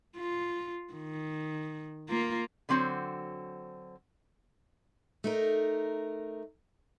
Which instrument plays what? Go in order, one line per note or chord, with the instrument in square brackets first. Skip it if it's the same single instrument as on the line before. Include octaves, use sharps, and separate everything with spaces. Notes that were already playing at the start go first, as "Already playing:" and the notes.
[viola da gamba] F4
D#3
A#3 F4 A#4
[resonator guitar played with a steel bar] D3 F#3 C4 F#4 C5
[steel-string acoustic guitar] A3 D#4 A#4